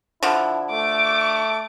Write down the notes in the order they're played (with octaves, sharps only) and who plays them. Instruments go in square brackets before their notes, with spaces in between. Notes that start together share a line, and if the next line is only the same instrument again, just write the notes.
[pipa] D3 F3 [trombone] E4
[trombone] A3 [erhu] D6